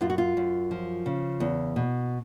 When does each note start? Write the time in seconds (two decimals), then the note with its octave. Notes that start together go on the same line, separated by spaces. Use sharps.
0.01 F#2 F4
0.10 F#4
0.18 F4
0.37 F#2
0.71 F3
1.06 C#3
1.40 E2
1.76 B2